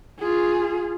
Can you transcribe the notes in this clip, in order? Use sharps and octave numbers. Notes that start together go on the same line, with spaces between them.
F4 G#4